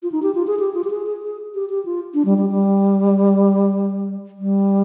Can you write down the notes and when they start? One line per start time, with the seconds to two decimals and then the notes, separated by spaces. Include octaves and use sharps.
0.03 F4
0.12 D#4
0.23 G4
0.35 F4
0.47 G#4
0.59 G4
0.74 F4
0.84 G4
0.90 G#4
1.07 G#4
1.22 G#4
1.55 G4
1.69 G4
1.85 F4
2.14 D4
2.25 G3
2.38 G3
2.49 G3
4.39 G3